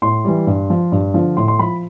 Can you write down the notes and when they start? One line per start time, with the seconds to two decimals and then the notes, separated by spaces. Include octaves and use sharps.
0.02 A2 C6
0.25 E3 G3
0.47 G2
0.70 F3
0.92 G2
1.14 D3 F3
1.37 A2 C6
1.48 C6
1.59 F3 B5